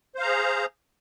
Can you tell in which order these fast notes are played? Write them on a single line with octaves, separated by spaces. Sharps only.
C5 F5 A#5 G#4